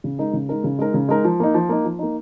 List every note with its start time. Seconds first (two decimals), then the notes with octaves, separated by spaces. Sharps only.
0.04 C#3
0.18 G#3 D#4 A#4
0.33 C#3
0.49 G#3 D#4 A#4
0.64 C#3
0.78 G#3 D#4 A#4
0.94 C#3
1.08 G#3 D#4 A#4
1.25 F3
1.40 A#3 D#4
1.54 F3
1.69 A#3 D#4
1.85 F3
1.99 A#3 D#4